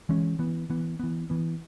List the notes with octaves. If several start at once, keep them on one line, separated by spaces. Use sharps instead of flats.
E3 G#3 C#4
E3 B3
E3 B3
E3 B3
E3 B3